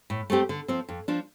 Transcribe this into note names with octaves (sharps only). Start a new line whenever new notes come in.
A2
A3 C4 G4
D3
F3 C4
F2
F3 D4